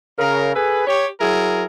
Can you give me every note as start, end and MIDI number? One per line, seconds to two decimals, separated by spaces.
0.19 0.54 49
0.19 0.54 70
0.55 0.84 68
0.55 0.84 69
0.55 0.84 71
0.87 1.07 67
0.87 1.07 73
1.21 1.64 54
1.21 1.64 64
1.21 1.64 68
1.21 1.64 70